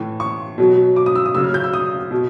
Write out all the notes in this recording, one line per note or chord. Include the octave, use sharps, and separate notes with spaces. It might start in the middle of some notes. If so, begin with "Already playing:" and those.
Already playing: A2 E3
C#6
B2 F#3
D6
D#6
E6
D#6
C#3 F#3 E6
F6
G6
E6
D#6
B2